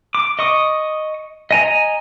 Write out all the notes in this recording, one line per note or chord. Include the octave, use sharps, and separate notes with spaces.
D6
D#5 C#6 D#6
D#5 G#5 A#5